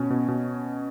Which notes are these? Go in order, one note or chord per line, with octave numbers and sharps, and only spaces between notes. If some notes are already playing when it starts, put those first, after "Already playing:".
Already playing: B2 C#4
B2
B2